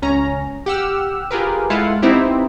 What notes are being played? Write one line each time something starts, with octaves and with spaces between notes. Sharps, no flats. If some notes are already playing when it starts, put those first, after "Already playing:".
C#2 C#4 A#5
G4 F#5 E6 F6
F4 G4 G#4 A#4 B4
G#3 E4 F4 A4 F5 F#5
B3 C4 D#4 E4 G4